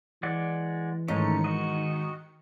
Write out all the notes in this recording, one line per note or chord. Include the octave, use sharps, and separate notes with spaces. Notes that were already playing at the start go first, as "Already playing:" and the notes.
E3 G#3 D5 F#5
G#2 D#3 A3 C#4 D#4 C#7
F#4 D#5